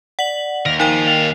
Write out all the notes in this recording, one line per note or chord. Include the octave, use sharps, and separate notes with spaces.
D5 F#5 F#7
D#2 A#4
F3 D#4 A#4 G5
D5 F5